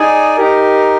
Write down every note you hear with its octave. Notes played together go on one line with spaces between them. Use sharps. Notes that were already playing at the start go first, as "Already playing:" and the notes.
Already playing: D#4 G#4 D5 G#5
D#4 G4 A#4